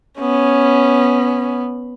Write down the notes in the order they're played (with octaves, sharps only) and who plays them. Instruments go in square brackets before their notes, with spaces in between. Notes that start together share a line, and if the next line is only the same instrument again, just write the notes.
[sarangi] B3 [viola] C#4